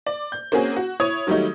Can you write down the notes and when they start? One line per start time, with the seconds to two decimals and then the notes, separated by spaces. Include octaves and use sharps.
0.06 D5
0.32 G6
0.52 A#3 C4 C#4 F#4 G#4
0.77 F#4
1.00 E4 C#5 D#6 G#6
1.27 D#3 F#3 G3 A3 D#4